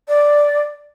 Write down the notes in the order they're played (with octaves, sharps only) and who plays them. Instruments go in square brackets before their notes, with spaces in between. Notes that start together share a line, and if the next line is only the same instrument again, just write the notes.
[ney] D5